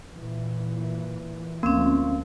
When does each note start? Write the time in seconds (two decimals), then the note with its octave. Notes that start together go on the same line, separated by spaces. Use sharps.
0.11 A#2 E3
1.63 D2 F3 A#3 C4 C#4